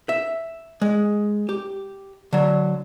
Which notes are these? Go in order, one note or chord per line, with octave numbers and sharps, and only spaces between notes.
E5
G#3
G4
D3 F#3